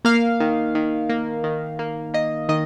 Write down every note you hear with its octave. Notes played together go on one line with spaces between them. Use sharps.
A#3 F5
D#3
D#3
A#3
D#3
A#3
A#3 D#5
D#3 D#5